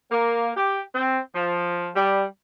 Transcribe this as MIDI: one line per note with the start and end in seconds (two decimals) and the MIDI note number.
0.12 0.51 58
0.56 0.80 67
0.94 1.18 60
1.34 1.89 53
1.95 2.23 55